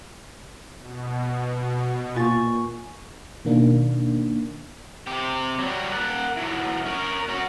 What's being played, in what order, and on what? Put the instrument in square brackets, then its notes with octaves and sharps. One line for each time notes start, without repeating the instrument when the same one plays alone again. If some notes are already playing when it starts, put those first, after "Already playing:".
[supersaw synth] B2
[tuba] A#2 [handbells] F4 A6 [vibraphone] G#5 C#6
[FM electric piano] B2 D#3 A#3 D4
[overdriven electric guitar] C3 G4
F#3 G3
A#3 F#5
E3 F#3
C#4 A#4
C#4 F#4